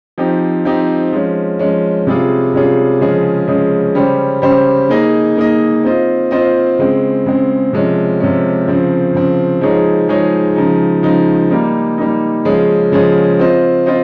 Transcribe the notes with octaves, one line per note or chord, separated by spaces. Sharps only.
F3 C4 D#4 G4
F3 C4 D#4 G4
F3 G#3 C#4
F3 G#3 C#4
C3 G3 C#4 F4 G#4
C3 G3 C#4 F4 G#4
C#3 F3 G#3 C#4 G#4
C#3 F3 G#3 C#4 G#4
C#3 G3 C#4 G4 C5
C#3 G3 C#4 G4 C5
A#3 D#4 G#4 D#5
A#3 D#4 G#4 D#5
C4 F4 C5 D#5
C4 F4 C5 D#5
C#3 G#3 C4
C#3 G#3 C4
C3 F3 G#3 C#4
C3 F3 G#3 C#4
C#3 F3 C4
C#3 F3 C4
F3 G#3 D#4 G#4 C#5
F3 G#3 D#4 G#4 C#5
C#3 F3 G#3 D#4
C#3 F3 G#3 D#4
G3 A#3 D#4
G3 A#3 D#4
C#3 F3 G#3 C#4 G#4
C#3 F3 G#3 C#4 G#4
C4 F4 C5 D#5
C4 F4 C5 D#5